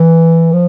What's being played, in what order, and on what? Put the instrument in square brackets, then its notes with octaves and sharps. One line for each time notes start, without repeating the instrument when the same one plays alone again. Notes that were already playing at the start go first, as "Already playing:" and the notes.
Already playing: [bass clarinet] E3
F3